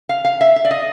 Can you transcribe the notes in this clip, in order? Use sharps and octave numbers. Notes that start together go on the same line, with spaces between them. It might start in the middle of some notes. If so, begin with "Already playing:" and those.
F5
F5
E5
E5
D5
D#5